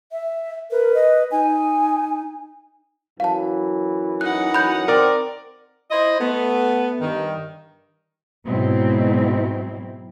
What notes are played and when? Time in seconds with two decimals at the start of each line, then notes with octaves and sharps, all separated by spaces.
0.12 E5
0.71 A#4 B4
0.95 D#5
1.31 D#4 G#5
3.20 F#2 E3 F#3 F5 A5
4.21 D#4 F#5 F#6
4.54 B5 F#6 G6
4.88 C4 A#4 D5
5.91 E4 C5 D#5
6.19 A3 B3
7.01 G2 D#3
8.47 G#2 B2 F#3 C4 E4